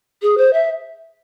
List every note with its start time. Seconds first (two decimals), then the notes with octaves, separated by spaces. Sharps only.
0.22 G#4
0.37 C5
0.53 E5